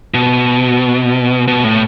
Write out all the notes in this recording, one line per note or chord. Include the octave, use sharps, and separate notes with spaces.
B2
B2
A2